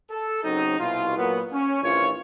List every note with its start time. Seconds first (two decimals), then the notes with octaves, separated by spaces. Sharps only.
0.11 A4
0.44 C#3 F#3 C4 D#4
0.79 C2 B2 F4
1.17 A#2 F#3 A#3 B3
1.52 C#4
1.83 A#1 E3 F3 C#4 F4 C#5